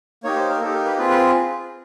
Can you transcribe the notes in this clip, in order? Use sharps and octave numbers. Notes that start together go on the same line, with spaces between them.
A#3 D#4 G4 C#5
C5
A#4
A#3 D#4 G4 A4
A#4
B4
C4 F4 G#4 B4
B4